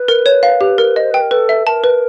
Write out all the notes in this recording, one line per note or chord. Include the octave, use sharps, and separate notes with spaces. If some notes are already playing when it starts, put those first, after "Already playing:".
Already playing: B4
A#4
C#5
F5
G4
A#4
C5 D#5
B4 G5
A#4
A4 B4
E5
A#4 A5
B4